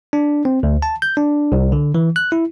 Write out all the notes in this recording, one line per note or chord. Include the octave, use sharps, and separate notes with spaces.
D4
C4
D2
A5
G6
D4
C2
D3
E3
F#6
E4